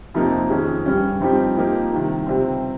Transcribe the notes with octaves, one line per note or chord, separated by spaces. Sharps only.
F2 C3 F3 A#3 D#4
F2 D#3 G#3 C#4
G2 G3 C#4
G2 F3 C4 D#4 G4
F3 A#3 D#4 G4
C2 C3 D#3
C#2 C3 G3 C4